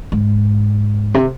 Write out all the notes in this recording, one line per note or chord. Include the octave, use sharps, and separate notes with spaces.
G#2
C3